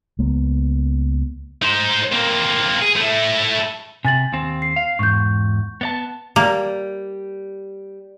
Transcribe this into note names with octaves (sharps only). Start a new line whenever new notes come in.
C#2 A#3 B3
D#4 C5
A#3 C4
G#4
A3 E4
C3 G#5 A6 F#7
D#2 C4
C7
F5
E2 G#2 C#6 G6
B3 D5 A5
G3 A#3